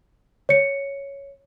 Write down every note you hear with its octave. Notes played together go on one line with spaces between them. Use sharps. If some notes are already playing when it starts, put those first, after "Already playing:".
C#5 C#7